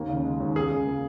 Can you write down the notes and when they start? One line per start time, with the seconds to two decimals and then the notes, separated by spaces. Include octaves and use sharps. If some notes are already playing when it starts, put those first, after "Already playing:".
Already playing: D#2 A#3
0.09 C#3
0.25 G#3
0.40 D#2
0.56 C#2 G#4
0.72 C#3
0.87 A#3